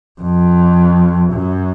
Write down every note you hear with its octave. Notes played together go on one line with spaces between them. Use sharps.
F2
F#2